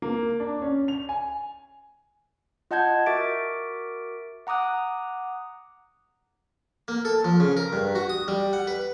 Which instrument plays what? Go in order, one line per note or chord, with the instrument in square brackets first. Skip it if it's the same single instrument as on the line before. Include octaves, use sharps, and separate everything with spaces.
[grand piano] A#3
D4
C#4
F7
G#5
[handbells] F4 D#5 F#5 A5 G6 G#6
F#4 A#4 E5 D6 A6 D7
F#5 A#5 D6 D#6 F#6
[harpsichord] A#3
A4
F3
C#3
A#4
G2
F#4
D#6
G3
F#5
B4